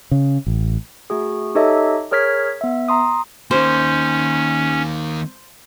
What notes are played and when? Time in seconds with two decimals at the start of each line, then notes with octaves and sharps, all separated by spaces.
0.11 C#3
0.47 A1
1.10 A3 F#4 G#4
1.55 D#4 G4 A4 C#5 D#5 E5
2.11 G#4 A#4 C#5 F6 G#6 B6
2.61 B3 E5
2.88 A#5 C6 D#6
3.51 D#3 A#3 C#4 C5